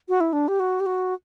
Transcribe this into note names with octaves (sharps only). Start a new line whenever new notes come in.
F#4
E4
D4
G4
F#4
G4
F#4